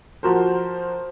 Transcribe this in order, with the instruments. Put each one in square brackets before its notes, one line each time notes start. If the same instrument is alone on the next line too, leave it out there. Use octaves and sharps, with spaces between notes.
[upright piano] F3 F#4 A#4 C5